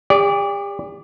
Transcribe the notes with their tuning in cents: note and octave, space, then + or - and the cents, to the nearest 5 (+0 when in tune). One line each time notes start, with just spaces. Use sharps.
G4 +40 D5 -25